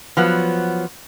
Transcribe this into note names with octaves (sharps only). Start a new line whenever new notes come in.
F3 F#3 B3